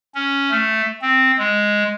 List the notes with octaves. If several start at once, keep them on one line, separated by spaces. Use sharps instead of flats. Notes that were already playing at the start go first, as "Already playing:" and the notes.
C#4
A3
C4
G#3